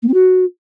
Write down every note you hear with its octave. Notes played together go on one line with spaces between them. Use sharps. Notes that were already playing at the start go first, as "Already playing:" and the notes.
A#3
C4
F#4